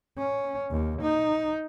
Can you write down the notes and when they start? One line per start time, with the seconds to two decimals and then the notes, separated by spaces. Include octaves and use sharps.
0.18 C#4
0.71 D#2
1.02 D#4